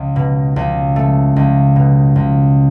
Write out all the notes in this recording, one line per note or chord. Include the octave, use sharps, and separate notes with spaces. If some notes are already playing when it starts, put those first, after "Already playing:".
Already playing: C#2
B2
C#2
A3
C#2
B2
C#2